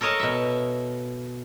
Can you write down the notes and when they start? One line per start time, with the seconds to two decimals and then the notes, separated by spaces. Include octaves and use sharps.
0.01 A4 A#4 C#5 D#5 A5
0.19 B2 E5